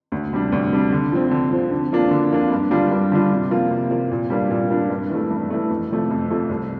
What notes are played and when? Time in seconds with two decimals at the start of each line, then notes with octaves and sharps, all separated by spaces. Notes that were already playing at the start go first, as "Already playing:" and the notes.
0.12 D2
0.33 C3 G3 D4
0.52 D2
0.72 C3 G3 D4
0.92 D3
1.12 F3 C4
1.31 D3
1.52 F3 C4
1.71 D3
1.92 F3 A#3 D4 F4
2.11 D3
2.32 F3 A#3 D4 F4
2.51 G2
2.71 D3 G3 D4 F4
2.91 G2
3.12 D3 G3 D4 F4
3.32 C3
3.51 F3 A#3 F4
3.71 C3
3.90 F3 A#3 F4
4.11 A#2
4.30 G3 A#3 D4 F4
4.50 A#2
4.70 G3 A#3 D4 F4
4.90 G2
5.10 E3 A3
5.30 G2
5.50 E3 A3
5.70 F2
5.91 C3 F3 A3
6.11 F2
6.30 C3 F3 A3
6.49 C2